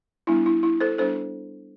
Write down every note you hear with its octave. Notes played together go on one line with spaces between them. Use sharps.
G3 B3 D4 E4
E4
E4
A4 C5
G3 B3 D4 A4 C5